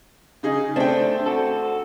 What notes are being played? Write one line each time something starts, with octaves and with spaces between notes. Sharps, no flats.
C#3 D#4 G#4
A3 C4 D4 G5
F#4 A4